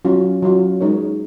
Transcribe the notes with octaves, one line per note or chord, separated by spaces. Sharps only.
F#3 C#4 F4
F#3 C#4 F4
G#3 D#4 A#4 C#5